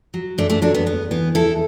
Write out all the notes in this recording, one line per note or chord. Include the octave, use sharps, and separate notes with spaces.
F#3
F#2 A3 D4
A3 D4
F#3 D4 F#4
B3
E2 B3
E3 B3
E2 E4 A4